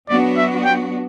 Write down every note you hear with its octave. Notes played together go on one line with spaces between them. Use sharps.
F#3 B3 D4 F#4 D5
E5
G5